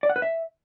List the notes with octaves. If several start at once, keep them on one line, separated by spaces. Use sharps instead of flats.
D5
F#5
B4
E5